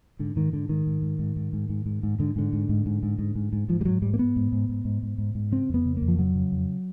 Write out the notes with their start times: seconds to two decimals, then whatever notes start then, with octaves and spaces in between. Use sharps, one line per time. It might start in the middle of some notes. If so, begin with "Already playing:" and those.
0.19 G#2 D3
0.36 G#2 D#3
0.52 G#2 D3
0.69 G#2 D#3
0.87 G#2
1.02 G#2
1.19 G#2
1.36 G#2
1.53 G#2
1.69 G#2
1.86 G#2
2.03 G#2
2.19 G#2 D3
2.36 G#2 D3
2.53 G#2
2.69 G#2
2.86 G#2
3.03 G#2
3.19 G#2
3.35 G#2
3.53 G#2
3.68 G#2 F3
3.81 G3
3.85 G#2 F#3
4.02 G#2 G3
4.14 A#3
4.18 G#2 B3
4.36 G#2
4.52 G#2
4.69 G#2
4.85 G#2
5.03 G#2
5.18 G#2
5.35 G#2
5.51 C#3 C4
5.69 F2 B3
5.85 C#3
5.97 F2 A#3
6.08 F3
6.19 C#3 F#3
6.35 C#3
6.52 F2